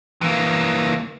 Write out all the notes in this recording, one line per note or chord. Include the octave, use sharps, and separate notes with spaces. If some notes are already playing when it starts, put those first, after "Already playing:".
E3 A#3